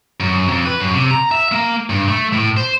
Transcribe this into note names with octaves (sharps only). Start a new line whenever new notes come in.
F#2
F2
B4
F#2
C3
A#5
E5
A#3
G2
A3
A2
C5